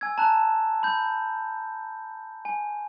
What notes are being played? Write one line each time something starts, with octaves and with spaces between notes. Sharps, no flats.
G#5 E6 G#6
A5 A#5 F#6 E7
B5 G6
G#5